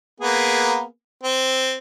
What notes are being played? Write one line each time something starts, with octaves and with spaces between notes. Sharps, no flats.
A#3 B3 G#4
C4